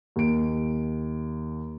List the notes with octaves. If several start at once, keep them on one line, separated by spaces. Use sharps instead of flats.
D#2 D7